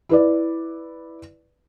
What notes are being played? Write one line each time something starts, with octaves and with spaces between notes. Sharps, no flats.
E4 B4 D5